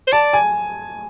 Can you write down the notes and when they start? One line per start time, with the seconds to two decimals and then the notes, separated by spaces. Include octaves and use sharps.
0.08 C5
0.12 D5 A5
0.33 G#5